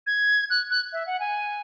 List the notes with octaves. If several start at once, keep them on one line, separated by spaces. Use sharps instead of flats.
G#6
F#6
F#6
E5
F#5
G#5